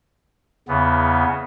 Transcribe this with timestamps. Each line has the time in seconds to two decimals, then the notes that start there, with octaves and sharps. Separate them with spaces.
0.68 E2 C#3 B3